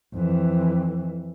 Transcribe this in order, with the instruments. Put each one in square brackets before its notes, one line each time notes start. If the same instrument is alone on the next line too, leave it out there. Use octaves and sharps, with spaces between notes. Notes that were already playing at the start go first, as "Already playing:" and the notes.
[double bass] F2 E3